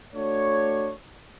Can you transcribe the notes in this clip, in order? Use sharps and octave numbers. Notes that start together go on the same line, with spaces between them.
A3 D4 F#4 C#5